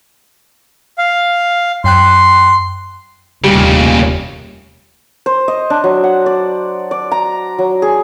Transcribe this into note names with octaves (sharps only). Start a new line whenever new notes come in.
F5
F#2 G5 C6 F#6
F1 D#2 A#2 C#3 G3
C5
D#5
D4
F#3
F#5
D5
D5
A#5
F#3
G#4